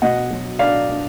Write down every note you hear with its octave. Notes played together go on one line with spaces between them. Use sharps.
B2 D#5 F#5
F#3
D4 D5 F5
D4